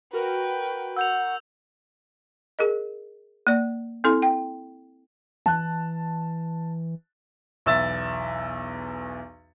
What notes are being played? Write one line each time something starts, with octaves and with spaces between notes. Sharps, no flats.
F#4 A#4 B4 G5
F#5 E6 G6 F7
G#4 A#4 D#5
A#3 D5
C4 E4 A4 C6
G5
E3 A5 F#6
B1 E2 E5 E6 A6